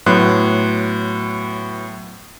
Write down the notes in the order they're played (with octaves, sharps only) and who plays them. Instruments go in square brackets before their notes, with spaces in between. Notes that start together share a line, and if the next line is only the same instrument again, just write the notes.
[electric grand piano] A2 F#3 B3 C6 F#6